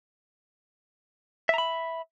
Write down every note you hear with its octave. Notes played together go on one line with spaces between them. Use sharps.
E5 A#5 B5